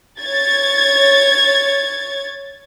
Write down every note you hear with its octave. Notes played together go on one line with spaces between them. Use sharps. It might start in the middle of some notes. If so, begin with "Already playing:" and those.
C#5 G#6 A6